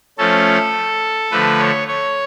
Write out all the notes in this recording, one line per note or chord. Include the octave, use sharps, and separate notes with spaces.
F3 A3 C#4 A4
D3 F3 A3 B4
C#5
C#5